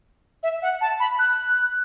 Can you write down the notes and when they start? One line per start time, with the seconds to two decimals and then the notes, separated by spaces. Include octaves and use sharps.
0.43 E5
0.62 F#5
0.81 A5
1.00 B5
1.19 F#6